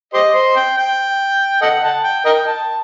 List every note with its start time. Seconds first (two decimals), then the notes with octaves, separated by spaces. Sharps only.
0.14 G4 C5 D#5
0.34 C5
0.56 G5
0.78 G5
1.62 A4 D#5 F#5
1.84 F#5 A5
2.04 G5
2.25 A#4 D#5 G5
2.47 A5